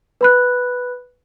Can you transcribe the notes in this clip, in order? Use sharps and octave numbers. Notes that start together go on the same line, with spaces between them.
B4 B5 F#6